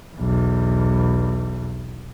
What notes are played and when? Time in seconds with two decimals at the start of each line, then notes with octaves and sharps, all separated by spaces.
0.16 B1 E2